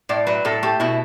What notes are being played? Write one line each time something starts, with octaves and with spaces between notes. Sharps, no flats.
A2 D5
F#3 B4
A2 A4
A3 G4
B2 E4